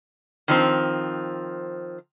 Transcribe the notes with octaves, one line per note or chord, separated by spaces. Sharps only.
D#3 F3 C4